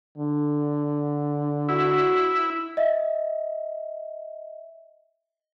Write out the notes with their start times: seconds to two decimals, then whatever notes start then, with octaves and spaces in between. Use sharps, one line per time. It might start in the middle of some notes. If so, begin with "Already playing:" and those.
0.18 D3
1.69 E4 F#4
2.77 D#5 E5